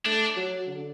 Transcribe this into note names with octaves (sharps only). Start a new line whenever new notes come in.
A3 D4
F#3
D3